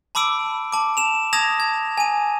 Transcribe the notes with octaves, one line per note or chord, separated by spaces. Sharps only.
A5 B5 D6 E6 D7
A5 D6
E7 F7
A5 D#6 G#6 A#6 F7
G#6
G#5 D#7